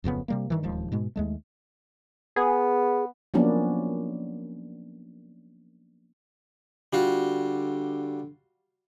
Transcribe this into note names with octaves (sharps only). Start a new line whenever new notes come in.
D1 F2 C#3 B3
C3 G3 A#3
G2 D#3 E3
D1 D#2 F3 G#3
G#2 B2 G#3
D#2 G#3 A3
B3 G#4
F3 F#3 A#3 B3 C#4 D4
D3 G3 F4 F#4